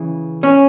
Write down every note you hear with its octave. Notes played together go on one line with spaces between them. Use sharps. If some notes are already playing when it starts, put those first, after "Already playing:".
Already playing: C#3 E3
C#4